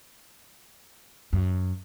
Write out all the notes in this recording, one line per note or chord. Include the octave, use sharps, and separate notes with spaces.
F#2